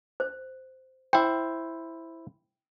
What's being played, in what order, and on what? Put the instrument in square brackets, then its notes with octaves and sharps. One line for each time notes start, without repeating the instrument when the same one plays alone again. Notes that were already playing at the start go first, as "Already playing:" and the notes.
[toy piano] C5
[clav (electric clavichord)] E4 C5 [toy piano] G5